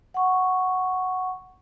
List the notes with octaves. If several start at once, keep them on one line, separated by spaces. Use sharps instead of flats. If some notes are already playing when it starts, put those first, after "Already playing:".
F#5 C#6